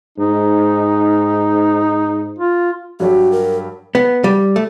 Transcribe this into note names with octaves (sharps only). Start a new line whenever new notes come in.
G#2 D#4
F4
G2 F#3 F#4 G4
A#4
B3
G3
A3